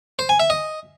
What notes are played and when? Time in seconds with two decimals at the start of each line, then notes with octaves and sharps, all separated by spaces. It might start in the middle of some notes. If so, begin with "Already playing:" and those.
0.19 C5
0.29 G#5
0.40 E5
0.50 D#5